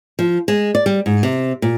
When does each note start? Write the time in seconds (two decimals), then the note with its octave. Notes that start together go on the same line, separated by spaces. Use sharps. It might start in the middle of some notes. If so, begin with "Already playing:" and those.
0.19 F3
0.48 G#3
0.75 D5
0.86 G3
1.06 G#2
1.23 C3
1.62 A#2